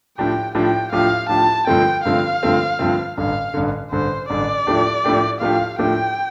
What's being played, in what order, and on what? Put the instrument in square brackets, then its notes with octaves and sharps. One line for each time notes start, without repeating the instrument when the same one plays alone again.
[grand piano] A2 F3 D4 G4 [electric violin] G5
[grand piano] A2 F3 D4 G4 [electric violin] G5
[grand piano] A2 F3 D4 G4 [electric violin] F5
[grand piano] A2 F3 D4 G4 [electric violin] A5
[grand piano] G2 D3 F3 A3 C4 [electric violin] G5
[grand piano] G2 D3 F3 A3 C4 [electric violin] F5
[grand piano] G2 D3 F3 A3 C4
G2 D3 F3 A3 C4
[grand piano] A1 G2 D3 [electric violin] F5
[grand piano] A1 G2 D3
[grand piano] A1 G2 D3 [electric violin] C5
[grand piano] A1 G2 D3 [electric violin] D5
[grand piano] A2 F3 A3 D4 G4
A2 F3 A3 D4 G4
[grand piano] A2 F3 A3 D4 G4 [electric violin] F5
[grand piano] A2 F3 A3 D4 G4 [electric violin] G5